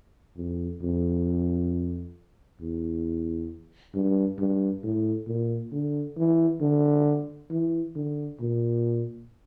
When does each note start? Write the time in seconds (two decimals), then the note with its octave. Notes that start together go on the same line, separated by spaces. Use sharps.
0.37 F2
0.81 F2
2.61 E2
3.95 G2
4.39 G2
4.84 A2
5.28 A#2
5.72 D3
6.17 E3
6.61 D3
7.51 E3
7.96 D3
8.40 A#2